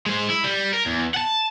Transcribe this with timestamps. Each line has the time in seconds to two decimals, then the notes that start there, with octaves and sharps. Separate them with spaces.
0.06 G#3 C5
0.30 E4
0.44 G3
0.74 A#4
0.86 E2
1.14 F#5 A5